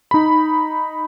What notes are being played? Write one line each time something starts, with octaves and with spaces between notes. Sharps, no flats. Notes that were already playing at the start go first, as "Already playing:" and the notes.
D#4 B5